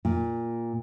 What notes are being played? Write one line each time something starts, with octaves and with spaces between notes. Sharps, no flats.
A#2